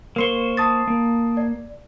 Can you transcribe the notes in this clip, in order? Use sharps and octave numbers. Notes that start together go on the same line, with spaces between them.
A#3 A#4 C5 C6 C#6 G7
A5 D#6 A6
A#3
D5